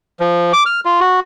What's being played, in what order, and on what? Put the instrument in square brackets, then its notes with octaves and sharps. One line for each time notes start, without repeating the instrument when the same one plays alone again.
[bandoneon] F3
D6
F6
F4
F#4